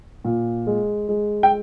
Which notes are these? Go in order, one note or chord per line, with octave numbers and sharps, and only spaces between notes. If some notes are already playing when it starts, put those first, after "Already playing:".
A#2
G#3
G#3
G5